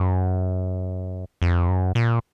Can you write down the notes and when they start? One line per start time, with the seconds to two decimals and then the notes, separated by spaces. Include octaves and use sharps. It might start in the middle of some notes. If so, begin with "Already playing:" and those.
Already playing: F#2
1.42 F2
1.68 F#2
1.95 A#2